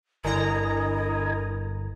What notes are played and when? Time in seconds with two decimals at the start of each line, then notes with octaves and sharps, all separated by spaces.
0.25 G1 D3 E4 A#4 D#5 G#5 A#5